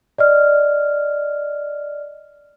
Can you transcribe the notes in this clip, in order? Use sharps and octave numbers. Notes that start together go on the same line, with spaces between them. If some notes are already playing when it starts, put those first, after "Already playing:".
D5 D#5 F6